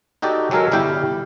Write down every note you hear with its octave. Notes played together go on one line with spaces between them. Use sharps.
D#4 F#4 G4 A4 D5
F#3 G#3 A4 A#4 C#5 F5
G1 G3 E4 G4 F5 G5